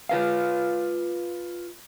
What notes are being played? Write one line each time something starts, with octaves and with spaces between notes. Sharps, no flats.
F4 B4 F5